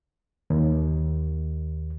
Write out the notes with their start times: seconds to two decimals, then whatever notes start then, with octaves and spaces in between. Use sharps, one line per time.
0.50 D#2